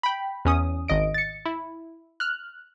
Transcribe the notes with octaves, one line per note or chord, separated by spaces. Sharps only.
G5 B5
E2 C#4 D#6
G#1 D#5 D7
A6 C#7
E4
F6 F#6